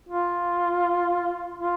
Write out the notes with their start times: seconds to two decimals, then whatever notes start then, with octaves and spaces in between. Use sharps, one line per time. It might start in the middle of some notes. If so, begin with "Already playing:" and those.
0.09 F4
1.59 F4